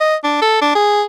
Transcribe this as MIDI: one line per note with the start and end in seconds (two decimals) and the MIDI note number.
0.01 0.16 75
0.24 0.39 62
0.42 0.58 69
0.61 0.74 62
0.75 1.04 68